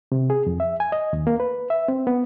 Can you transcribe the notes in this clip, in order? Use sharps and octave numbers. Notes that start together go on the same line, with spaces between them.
C3
G#4
F2
E5
G#5
D#5
D#2
A#3
B4
E5
C4
B3